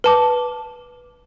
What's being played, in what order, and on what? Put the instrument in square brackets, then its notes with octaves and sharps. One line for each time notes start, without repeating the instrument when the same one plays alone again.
[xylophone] B4 A5 D6